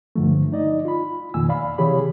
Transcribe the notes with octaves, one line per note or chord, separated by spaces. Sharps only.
G2 D3 F3 A3
D#4 D5 D#5
F4 B5
F2 B2 D#3 A#3 G#5 E6
D5 F5 B5
C3 E3 G4 G#4 C#5 B5